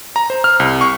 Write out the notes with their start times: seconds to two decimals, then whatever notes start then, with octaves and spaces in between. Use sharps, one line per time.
0.16 A#5
0.30 C5
0.44 F6
0.60 C2
0.81 C#6